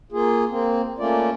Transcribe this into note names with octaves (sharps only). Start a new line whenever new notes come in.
A#3 F4 G#4
A#3 C4
A3 A#3 C#4 F4 D5